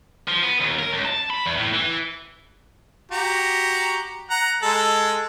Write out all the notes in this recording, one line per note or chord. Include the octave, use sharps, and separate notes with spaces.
F3
B3
D#2
A#4
C#2
A5
B5
E2
A2
E3
F#4 G4 A#5
F#5 A#5
G#3 A4